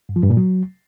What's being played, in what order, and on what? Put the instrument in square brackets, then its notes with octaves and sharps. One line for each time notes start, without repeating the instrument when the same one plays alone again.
[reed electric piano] G2
F3
G2
A#2
F#3